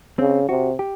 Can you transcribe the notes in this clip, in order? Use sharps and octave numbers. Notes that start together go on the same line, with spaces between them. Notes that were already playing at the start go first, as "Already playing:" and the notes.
C#3 C4
C3 F#4
G4